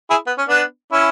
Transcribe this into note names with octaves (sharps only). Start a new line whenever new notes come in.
E4 G#4
B3
C#4
B3 D4
C#4 E4